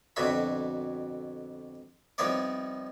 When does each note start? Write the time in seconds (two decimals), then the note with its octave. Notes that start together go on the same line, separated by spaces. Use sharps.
0.16 F2 B2 D3 F#4 E5 B5
2.18 C2 F3 B3 D#4 C#5 D5